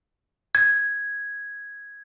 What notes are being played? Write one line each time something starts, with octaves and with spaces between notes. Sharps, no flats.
G#6